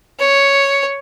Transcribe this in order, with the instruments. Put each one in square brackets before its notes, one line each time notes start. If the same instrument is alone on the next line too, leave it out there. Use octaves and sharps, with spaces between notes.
[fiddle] C#5